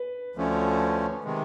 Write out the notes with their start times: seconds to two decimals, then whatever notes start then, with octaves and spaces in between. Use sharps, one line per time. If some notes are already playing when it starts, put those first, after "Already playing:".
Already playing: B4
0.35 D2 D3 F3 A3 C#4
1.24 C3 D#3 G#3